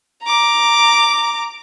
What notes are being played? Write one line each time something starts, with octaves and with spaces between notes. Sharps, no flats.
A#5 D6